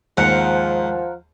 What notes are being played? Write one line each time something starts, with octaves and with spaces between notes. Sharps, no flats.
D#2 G#2 F3 A#4 F#5